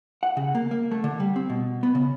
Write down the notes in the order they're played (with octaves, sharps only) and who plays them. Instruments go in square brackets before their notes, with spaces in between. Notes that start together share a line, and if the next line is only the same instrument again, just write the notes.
[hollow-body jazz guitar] F#5
C#3
A#3
A#3
A3
D3
G3
C4
B2
B3
C#3